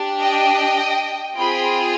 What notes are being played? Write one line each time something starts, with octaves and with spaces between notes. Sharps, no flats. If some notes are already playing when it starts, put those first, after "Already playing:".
Already playing: D4 G4
D#5 G5
C4 F4 G#4 G5 B5